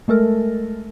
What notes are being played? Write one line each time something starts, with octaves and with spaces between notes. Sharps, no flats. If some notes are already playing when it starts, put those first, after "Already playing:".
G#3 A3 A4 A#4